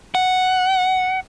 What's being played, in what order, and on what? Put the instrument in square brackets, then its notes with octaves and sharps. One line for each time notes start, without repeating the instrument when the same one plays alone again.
[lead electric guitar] F#5